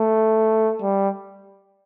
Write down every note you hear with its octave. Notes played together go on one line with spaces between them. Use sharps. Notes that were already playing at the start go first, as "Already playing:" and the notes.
Already playing: A3
G3